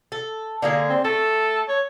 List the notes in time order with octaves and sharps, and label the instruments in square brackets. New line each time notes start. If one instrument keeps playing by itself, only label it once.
[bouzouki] A4
D3 A#3 G#4
[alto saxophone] C4
[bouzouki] A3 [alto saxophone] A4
[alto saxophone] C#5